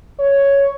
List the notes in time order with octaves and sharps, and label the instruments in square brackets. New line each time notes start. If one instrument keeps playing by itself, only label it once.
[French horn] C#5